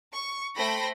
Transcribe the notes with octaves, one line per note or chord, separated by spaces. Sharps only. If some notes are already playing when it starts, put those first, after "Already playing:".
C#6
A3 C5 G5 B5 A#6